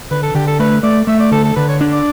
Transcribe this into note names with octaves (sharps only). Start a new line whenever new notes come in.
D3 B4
A4
D3 G4
A4
A3 B4
A3 D5
A3 E5
D5
D3 A4
A4
D3 B4
C#5
D4
D5